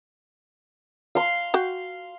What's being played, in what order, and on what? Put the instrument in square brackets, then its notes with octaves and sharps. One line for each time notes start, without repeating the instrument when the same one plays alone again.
[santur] F5 C6
[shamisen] F#4 G5